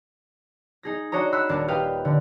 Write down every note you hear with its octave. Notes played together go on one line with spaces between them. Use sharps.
D#4 G#4 A#6
D4 F#4 C#5 D#5 A#5
F#5 B5 C6 E6 F#6
D#1 D4 A#4 F#5
G4 B4 D#5 F5 G5
D3